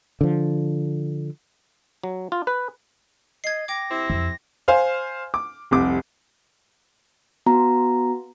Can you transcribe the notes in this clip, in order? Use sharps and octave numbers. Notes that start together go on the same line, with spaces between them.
D3 F3
F#3
F4
B4
D#5 G#6 C7
G5 D6 A#6
C3 C4 E4
F2
C5 F5 G#5 F6
D6
F1 C2 D6
B3 F#4 A#5